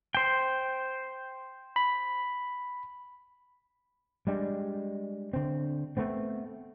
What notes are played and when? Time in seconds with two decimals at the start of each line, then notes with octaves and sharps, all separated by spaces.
0.15 C5 G5
1.76 B5
4.27 G3 G#3 D4
5.33 D3 C4
5.97 A3 B3 C4